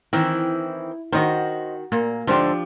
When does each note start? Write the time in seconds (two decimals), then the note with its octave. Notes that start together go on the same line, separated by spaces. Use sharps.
0.13 D#3 E3 C4 E4
1.12 D#3 F#4 C5 D#5
1.92 A#2 A#3
2.27 G#2 D3 F3 D4 G4 C5